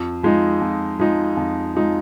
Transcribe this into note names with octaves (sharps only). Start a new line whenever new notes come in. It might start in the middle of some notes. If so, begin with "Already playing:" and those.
Already playing: F2
F3 G#3 D#4
F2
F3 G#3 D#4
F2
F3 G#3 D#4